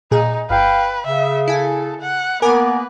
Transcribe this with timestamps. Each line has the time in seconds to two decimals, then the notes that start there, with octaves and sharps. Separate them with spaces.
0.11 A#2 D#4 G#4
0.50 G1 B4 F5 G5
1.06 C#3 E5
1.48 E4 A4 G#5
2.01 F#5
2.42 A#3 B3 A#4 B4 G#5 D6